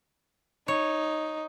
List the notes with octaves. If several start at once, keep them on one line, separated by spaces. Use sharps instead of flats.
D#4 C#5